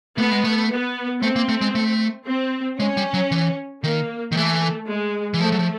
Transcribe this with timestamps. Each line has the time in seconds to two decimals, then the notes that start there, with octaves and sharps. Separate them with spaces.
0.18 A3 B3
0.31 G#3
0.44 A3
0.71 B3
1.22 A3 C4
1.36 A#3
1.49 A3
1.61 G#3
1.75 A3
2.27 C4
2.79 G#3 C#4
2.97 G3
3.14 F#3
3.31 E3
3.84 D#3 A#3
4.32 D#3
4.36 E3 A3
4.88 G#3
5.34 E3
5.40 F3 A3
5.52 F#3
5.59 F3